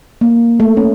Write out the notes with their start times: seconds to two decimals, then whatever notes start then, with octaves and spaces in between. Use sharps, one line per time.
0.21 A#3
0.60 A3
0.77 C#4